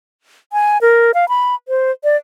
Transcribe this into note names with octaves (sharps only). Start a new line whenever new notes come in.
G#5
A#4
F5
B5
C5
D5